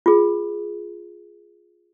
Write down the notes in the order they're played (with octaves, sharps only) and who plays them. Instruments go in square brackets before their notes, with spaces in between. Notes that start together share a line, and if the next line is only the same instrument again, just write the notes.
[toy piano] F4 G#4